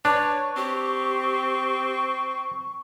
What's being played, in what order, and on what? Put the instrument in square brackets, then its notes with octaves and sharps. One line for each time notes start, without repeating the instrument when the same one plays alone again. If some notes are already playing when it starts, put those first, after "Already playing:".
[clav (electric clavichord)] D4 [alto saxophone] B4 [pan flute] C#5 [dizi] C#6
[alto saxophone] C4 [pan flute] G4